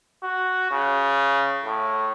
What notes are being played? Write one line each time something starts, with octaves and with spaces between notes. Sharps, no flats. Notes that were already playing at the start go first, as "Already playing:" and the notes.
F#4
C#3
A2